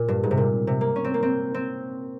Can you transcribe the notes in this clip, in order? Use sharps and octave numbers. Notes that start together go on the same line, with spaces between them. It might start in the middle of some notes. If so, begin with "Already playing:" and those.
Already playing: A#2
G2
G#2
C3
A#2
C3
A#3
C#4
C4
A#3
C4
C4